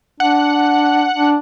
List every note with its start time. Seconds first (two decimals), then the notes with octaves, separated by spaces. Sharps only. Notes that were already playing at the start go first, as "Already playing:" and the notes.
0.20 D4 F#5
1.15 D4